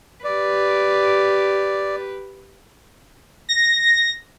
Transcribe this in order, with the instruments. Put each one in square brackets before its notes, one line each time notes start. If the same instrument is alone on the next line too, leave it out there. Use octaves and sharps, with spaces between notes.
[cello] G4 B4 [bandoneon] D5
[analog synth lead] A#6